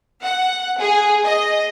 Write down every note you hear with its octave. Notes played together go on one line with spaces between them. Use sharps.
F#5
G#4
D#5